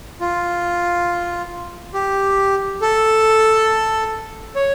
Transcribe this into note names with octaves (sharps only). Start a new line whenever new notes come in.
F4
G4
A4
C#5